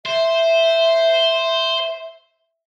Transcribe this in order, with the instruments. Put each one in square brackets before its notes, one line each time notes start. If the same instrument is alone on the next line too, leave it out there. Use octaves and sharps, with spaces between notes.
[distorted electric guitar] C5 [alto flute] E5